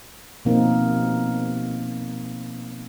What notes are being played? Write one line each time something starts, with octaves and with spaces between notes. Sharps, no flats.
B2 F3 A#3 C4 D#4